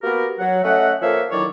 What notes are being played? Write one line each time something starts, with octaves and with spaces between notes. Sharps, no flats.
A#3 B3 F#4 G4 A#4
F#3 F#5
A3 C#4 D#5 E5 F#5
F3 A#3 A4 C#5 E5 F5
D3 D#3 F#3 E4 C#5 D5